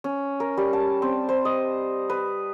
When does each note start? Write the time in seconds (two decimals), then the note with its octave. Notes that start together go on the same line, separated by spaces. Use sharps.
0.04 C#4
0.40 A#4
0.57 G3
0.73 A5
1.02 C4
1.29 C5
1.45 D#5
2.10 B4